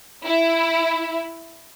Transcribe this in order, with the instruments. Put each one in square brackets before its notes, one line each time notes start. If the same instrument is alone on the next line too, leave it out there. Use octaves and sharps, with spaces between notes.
[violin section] E4